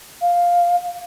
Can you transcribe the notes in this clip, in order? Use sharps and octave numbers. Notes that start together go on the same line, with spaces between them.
F5